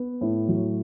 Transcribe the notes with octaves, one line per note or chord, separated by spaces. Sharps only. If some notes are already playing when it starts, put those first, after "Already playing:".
Already playing: B3
A2
F#3